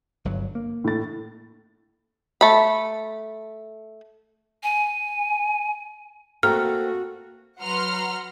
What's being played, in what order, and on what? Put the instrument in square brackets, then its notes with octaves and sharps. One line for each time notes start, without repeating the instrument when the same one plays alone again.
[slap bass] G1 G2 F#3
A#3
[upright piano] A2 A6
[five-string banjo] A3 B5
[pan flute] G#5
[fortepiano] A3 A#5 [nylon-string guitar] A#3 C4 [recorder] F#4 [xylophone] F6
[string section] F#3 B4 F#5 A#5 C6 F6